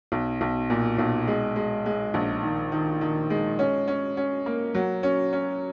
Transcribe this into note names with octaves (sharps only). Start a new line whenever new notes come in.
B1
B1
A#2
B1
G#3
G#3
G#3
A#1
D#3
D#3
D#3
G#3
C#4
C#4
C#4
A#3
F#3
C#4
C#4